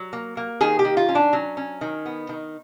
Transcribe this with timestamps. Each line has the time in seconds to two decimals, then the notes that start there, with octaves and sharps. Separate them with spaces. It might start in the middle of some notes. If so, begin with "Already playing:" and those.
Already playing: F#3
0.13 A#3
0.37 A#3
0.61 D#3 G#4
0.79 G4
0.85 D#3
0.97 F4
1.09 C#4
1.15 D4
1.33 F#3 C#4
1.57 C#4
1.81 D#3
2.05 B3
2.29 D#3